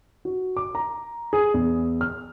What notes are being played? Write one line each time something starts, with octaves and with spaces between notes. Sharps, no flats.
F#4
D6
A#5
G#4
E2
F6